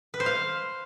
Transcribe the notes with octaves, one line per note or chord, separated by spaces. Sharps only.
B4
C5
F5